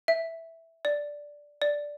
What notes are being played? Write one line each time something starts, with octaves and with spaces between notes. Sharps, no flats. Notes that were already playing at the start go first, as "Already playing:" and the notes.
E5
D5
D5